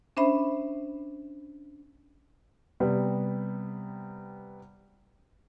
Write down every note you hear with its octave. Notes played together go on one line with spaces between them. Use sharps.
C#4 D4 C5 E5 B5
C3 G3 B3